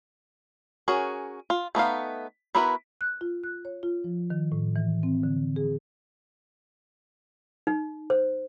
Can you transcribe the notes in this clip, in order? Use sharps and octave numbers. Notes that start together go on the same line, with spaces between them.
C#4 F#4 G#4 A#4
F4
A3 B3 D#4 F5
B3 E4 F#4 A#4 B4
F#6
F4
F#6
C#5
F4
F3
D#3
A2
E3
C4
D3
G#4
D#4
C5